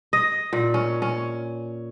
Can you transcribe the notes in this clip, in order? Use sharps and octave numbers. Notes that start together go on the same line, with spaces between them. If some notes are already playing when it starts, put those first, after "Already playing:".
D#5
A#2
C#4
C#4